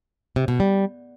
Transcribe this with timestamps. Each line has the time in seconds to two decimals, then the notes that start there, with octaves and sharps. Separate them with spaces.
0.36 C3
0.48 B2
0.60 G3